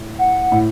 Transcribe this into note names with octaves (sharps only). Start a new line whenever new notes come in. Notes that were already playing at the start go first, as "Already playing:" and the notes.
Already playing: A2
F#5
A2